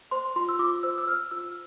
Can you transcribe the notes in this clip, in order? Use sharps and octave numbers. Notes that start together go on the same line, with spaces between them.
C5 C6
F4 C6
E6
F4 D6
C5 E6
E6
C5 F6
F4 E6